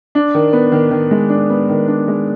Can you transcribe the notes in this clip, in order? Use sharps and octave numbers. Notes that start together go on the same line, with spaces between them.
D4
D#3
B3
D#3
D#3
G#3
D4
B3
D#3
D4
G#3